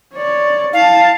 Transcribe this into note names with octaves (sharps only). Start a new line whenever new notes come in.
C#5 D5
E4 F5 A5